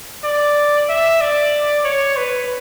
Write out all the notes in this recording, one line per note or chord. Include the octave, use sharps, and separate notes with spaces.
D5
E5
D5
C#5
B4